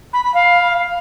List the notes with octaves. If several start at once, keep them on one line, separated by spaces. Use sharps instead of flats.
B5
B5
F5